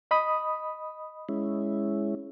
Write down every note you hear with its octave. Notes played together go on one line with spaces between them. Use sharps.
D#5 B5 D#6
G#3 C#4 E4